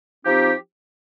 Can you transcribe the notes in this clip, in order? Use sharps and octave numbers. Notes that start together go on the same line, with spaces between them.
F3 C4 D#4 G4